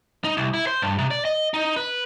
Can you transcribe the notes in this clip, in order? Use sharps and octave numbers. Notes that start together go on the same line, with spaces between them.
D#4
C2
E4
C5
G2
C3
D5
D#5
D#4
B4